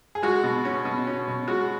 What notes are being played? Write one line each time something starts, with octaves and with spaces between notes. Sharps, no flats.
G#4
G#3 F#4
B2
C#4
B2
C#4
B2
G#3 F#4